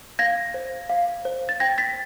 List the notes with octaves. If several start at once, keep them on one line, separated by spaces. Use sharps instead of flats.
F5 G#6 A#6
C5
F5
C5
A6
G5 G#6 A#6
A6 B6